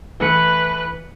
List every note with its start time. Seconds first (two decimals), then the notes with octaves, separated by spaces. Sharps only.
0.20 E3 A3 B4 C#7